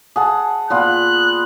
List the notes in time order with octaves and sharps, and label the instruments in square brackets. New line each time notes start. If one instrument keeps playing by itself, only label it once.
[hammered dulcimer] G#4 F#5 A5
[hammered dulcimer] A#2 B3 F4 [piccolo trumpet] F#6